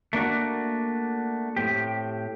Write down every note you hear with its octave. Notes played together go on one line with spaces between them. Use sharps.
A3 A#3 D4 F#4
A2 C4 G4